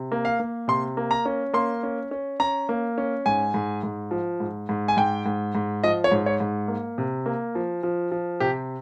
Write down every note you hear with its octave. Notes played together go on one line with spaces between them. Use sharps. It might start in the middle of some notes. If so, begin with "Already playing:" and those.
Already playing: C3
A#3
F5
A#3
C3 C6
A#3
A#5
C#4
A#3 C6
C#4
C#4
C#4 A#5
A#3
C#4
G#2 G#5
G#2
G#2
F3
G#2
G#2
G#5
G#2 G5
G#2
G#2
F3 D#5
C#5
G#2
C#5
G#2
A#3
C3
A#3
F3
F3
F3
C3 G4